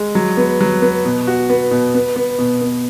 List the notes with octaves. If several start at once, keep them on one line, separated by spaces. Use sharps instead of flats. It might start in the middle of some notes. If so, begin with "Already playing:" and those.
Already playing: G#3
F#3
B3
F#3
B3
B2
F#4
B3
B2
B3
B3
B2
B3